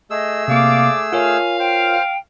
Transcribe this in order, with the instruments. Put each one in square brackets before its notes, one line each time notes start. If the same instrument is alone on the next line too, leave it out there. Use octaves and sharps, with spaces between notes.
[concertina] A3 G#4 E6 [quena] D#5
[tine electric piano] C3 A#3 [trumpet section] D5 D6 [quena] F5
[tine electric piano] F4 A#4 C#5 [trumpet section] F5 [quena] G#5
[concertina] C5 [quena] G5